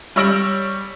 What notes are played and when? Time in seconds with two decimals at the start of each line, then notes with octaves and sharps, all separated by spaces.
0.16 G3 C#5 E6 A#6 D7 F#7